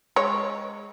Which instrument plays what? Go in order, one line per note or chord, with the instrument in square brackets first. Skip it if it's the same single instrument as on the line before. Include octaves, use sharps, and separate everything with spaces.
[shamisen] G#3 C#5